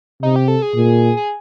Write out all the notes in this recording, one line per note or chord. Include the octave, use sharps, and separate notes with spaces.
C3 D#4
G4
A4
G#4
A#2
G#4